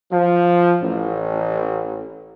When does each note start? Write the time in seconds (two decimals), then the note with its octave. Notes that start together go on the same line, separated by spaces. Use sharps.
0.12 F3
0.81 A1